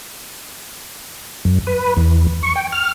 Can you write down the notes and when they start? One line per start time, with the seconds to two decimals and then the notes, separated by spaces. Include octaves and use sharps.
1.45 F#2
1.67 B4
1.97 E2
2.43 C#6
2.56 G5
2.72 F6